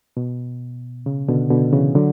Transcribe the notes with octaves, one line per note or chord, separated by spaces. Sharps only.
B2
C#3
B2 D3
B2 D3
C#3 E3
D3 F#3